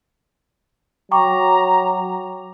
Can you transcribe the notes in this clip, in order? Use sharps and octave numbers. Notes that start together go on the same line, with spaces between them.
F#3 G5 A#5 C#6 D6